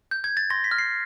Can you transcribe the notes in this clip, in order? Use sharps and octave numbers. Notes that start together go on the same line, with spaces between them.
G6
G#6
A6
C6 A#6
B6
F6
C7